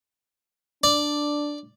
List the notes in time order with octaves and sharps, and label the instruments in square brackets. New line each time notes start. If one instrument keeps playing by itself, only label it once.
[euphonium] D4 [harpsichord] D5